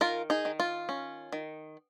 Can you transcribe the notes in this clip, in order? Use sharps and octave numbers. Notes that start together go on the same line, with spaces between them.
D#3 F4 A#4
D#4 G#4
D#3
F4
C#4
D#3